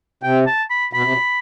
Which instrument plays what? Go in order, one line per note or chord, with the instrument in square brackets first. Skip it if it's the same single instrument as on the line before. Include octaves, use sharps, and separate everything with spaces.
[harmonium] C3 [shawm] G5
[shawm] A5
B5
[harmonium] B2 [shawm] B5
[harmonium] C3
B2